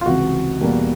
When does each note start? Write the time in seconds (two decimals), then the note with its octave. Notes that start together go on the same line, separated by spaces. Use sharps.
0.01 F4
0.06 C#2 C3 E3 F#4
0.61 E2 B2 G3 A#3